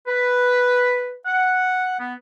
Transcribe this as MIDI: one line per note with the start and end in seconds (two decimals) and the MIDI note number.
0.07 1.15 71
1.26 1.98 78
1.99 2.13 59